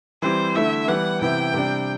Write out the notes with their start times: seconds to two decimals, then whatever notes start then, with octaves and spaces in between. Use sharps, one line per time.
0.22 E3 G3 C4 E4 C5
0.55 D3 A3 E4 E5
0.88 E3 G3 B3 F#5
1.21 C3 E3 B3 E4 G5
1.54 C3 G3 D4